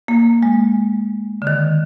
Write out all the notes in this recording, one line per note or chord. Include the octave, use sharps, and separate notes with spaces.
A#3
G#3
D3
D#3